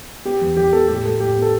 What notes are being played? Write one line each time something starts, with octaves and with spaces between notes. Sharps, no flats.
B3 G4
E2
E2 G4
B3 A4
A2 G4
A2 A4
A2 G4
B3
A4